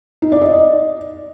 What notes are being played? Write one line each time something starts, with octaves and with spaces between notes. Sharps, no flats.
D#4
D5
D#5